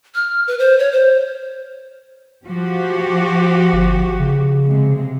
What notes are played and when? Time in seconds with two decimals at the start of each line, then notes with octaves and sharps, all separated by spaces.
0.15 F6
0.47 B4
0.59 C5
0.79 C#5
0.92 C5
2.47 F3 F#4 G4
3.73 G1
4.20 C#3
4.65 C3 G#3